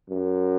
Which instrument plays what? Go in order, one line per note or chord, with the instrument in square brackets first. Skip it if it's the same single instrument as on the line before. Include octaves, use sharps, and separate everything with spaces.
[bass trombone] F#2